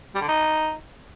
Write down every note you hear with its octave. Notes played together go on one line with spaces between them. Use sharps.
G3
D3
D#4